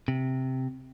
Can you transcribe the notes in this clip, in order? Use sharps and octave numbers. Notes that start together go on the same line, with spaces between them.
C3